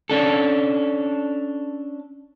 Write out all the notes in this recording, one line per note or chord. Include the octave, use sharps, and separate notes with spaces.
C#4 D4 A4